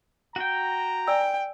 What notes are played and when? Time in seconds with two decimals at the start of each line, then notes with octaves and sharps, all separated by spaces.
0.36 F#4 G5 A#5
1.07 D5 G5 G#5 E6